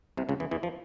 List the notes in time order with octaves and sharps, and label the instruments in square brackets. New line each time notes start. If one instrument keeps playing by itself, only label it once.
[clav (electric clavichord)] C2 C3
C#2 C#3
E2 E3
E2 E3
F3